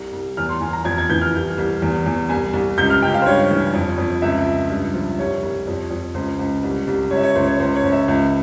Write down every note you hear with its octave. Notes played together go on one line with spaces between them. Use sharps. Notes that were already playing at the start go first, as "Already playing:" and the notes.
Already playing: C2
C2
E2 F6
C6
E2 G#5
A#5
F2 G#6
G#6
E3 G6
F6
C2
C2
E2
E2
C2 G#5
C2
C#2 G6
F6
C#2 G5
F5
C5
G2 C#5
E3
F2
F2
C#2 E5
C#2
G2
F3
C2 C#5
C2
F2
F2
C#2 C5
C#2
C2
C2
C#2 C#5
E5
C#5
C#2 C5
C#5
C#2 C5
C#5
C#2
E5
C#2